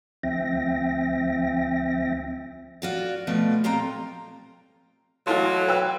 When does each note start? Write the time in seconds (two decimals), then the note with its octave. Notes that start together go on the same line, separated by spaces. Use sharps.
0.23 D2 F3 C4 E5 G5 A#6
2.82 F4 F#4 D5
3.27 B2 F3 A3 D5
3.64 F2 A#2 F4 G5 A#5
5.27 A1 F#3 E4 A4 F5 C6
5.69 B4 G5 E6